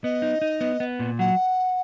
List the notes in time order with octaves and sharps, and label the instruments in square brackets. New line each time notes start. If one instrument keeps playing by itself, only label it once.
[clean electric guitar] B3 [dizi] D#5
[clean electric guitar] D#4
D#4
B3
B3
A#2
[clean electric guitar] F#3 [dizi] F#5